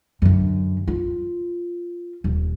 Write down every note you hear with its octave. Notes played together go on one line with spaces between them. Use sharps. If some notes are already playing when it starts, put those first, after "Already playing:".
F#2 D3
F4
D#1